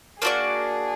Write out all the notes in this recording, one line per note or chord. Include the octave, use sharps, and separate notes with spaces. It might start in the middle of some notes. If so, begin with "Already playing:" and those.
A#3 D4 F#4 G#4 D5